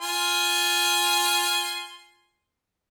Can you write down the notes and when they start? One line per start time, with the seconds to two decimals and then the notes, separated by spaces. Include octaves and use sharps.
0.01 F4 G#5 C6